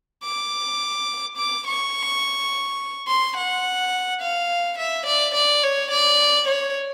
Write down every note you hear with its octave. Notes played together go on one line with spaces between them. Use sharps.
D6
D6
C#6
C6
F#5
F5
E5
D5
D5
C#5
D5
C#5